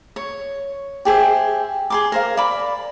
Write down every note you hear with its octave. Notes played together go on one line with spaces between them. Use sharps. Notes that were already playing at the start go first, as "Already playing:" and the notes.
C#5
G4 G#4 C5 E5
G#4 C6 D6
A#4 C5 F5
D5 B5